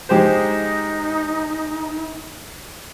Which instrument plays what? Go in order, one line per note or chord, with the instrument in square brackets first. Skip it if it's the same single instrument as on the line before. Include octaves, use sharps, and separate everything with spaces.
[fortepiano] G#3 G4 C5 [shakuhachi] D#4